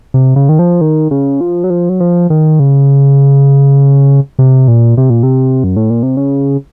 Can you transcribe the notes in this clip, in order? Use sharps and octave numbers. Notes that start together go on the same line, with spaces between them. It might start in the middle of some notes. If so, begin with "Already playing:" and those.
C3
C#3
D#3
F3
D#3
C#3
F3
F#3
F3
F#3
F3
D#3
C#3
C3
A#2
C3
A#2
C3
F#2
A2
A#2
C3
C#3